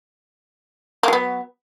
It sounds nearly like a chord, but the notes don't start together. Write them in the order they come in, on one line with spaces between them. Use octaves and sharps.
A#3 F#3 B3